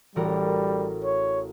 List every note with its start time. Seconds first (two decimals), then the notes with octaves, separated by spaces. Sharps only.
0.16 A1 G3 F#4 A#4
1.04 C#5